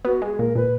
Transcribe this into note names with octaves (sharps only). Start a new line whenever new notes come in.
B3 F#4
G#3 G#4
A#2 A#4
A#2 B4